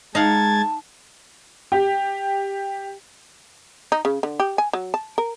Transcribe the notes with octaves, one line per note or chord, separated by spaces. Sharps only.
G#3 D#4 F5 F#5 A5 G#6 A6
G4
D#4
C#3
D3
G4
G#5
F#3
A5
A#4